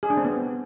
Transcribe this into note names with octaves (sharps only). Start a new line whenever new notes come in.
G#4
D4
C4
B3